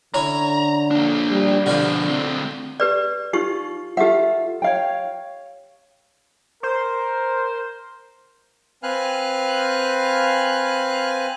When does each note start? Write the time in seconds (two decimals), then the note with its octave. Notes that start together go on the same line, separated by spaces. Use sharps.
0.14 D3 C#4 E4 C#5 A#5
0.91 A#3 D4
1.31 G3
1.66 B2 D3 F3 F#4 D5 F5
2.08 D2 C4
2.80 G4 B4 D5
3.33 D#4 F4 G4 C#6
3.97 F4 G4 A4 E5 F#5
4.62 C#5 F5 G5
6.63 A#4 C5
8.83 C4 B4 F5 G#5 F6 F#6